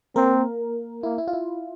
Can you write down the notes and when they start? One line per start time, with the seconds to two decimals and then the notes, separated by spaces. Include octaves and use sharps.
0.16 A#3 C4 A#4
1.03 A#3 E4
1.18 E4
1.28 F4
1.33 E4